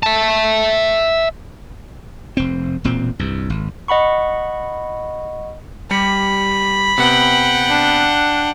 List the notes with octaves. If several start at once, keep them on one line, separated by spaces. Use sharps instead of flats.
E5 A5
F1 C4
E1 A#2 C4
C2 G2
G#1
D#5 F#5 B5 C#6
G3 G4 B5 C#7
C3 B3 F#5 G5
D4